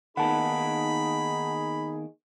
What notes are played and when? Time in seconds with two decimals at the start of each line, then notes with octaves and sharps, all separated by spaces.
0.17 D#3 A#3 B3 D#4 G#4 F#5 A5 B5